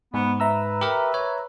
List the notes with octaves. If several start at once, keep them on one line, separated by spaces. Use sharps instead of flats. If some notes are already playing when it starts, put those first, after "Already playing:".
G#2 B3
B4 E5 A#5 E6
G4 A#4
C#5